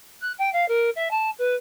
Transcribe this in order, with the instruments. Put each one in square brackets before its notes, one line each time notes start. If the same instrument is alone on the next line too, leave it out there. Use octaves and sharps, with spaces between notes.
[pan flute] F#6
G5
F5
A#4
E5
A5
B4